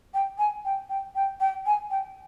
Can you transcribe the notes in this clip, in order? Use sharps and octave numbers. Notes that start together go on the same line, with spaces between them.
G5
G#5
G5
G5
G5
G5
G#5
G5